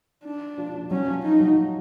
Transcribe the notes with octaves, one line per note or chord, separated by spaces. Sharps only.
D4
F3
F3
F#3 C#4
F3
D#4
F#3